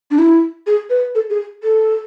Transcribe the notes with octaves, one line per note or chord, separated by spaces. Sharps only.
D4
E4
G#4
B4
A4
G#4
A4